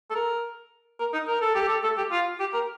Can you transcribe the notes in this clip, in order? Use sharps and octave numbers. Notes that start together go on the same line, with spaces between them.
A4
A#4
A#4
D#4
A#4
A4
G4
A4
A4
G4
F4
G4
A#4